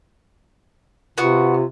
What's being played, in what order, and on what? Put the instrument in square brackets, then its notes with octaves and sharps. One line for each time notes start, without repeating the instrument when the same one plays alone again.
[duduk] C3 [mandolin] B3 F#4 [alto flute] F4